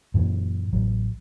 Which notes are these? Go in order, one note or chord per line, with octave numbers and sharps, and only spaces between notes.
F#2 A#2 E3
A1 F#3